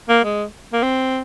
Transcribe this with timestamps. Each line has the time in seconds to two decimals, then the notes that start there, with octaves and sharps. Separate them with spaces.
0.09 A#3
0.24 G#3
0.73 A#3
0.83 C4